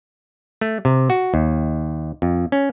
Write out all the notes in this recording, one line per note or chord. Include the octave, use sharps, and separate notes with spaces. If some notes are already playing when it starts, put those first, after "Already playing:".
A3
C3
F#4
D#2
F2
C#4